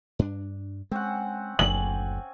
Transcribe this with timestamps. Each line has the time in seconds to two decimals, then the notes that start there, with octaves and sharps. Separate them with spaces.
0.19 G2 D4
0.92 G#3 C4 C#4 F#5
1.59 F#1 D2 G#5 F#7